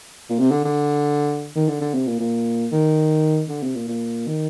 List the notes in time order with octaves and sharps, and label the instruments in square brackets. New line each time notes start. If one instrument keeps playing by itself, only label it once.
[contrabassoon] A#2
C3
D3
D3
D#3
D3
D3
C3
A#2
A#2
D#3
D3
C3
A#2
A#2
D#3